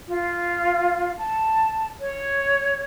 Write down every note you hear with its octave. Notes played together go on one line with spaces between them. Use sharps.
F4
A5
C#5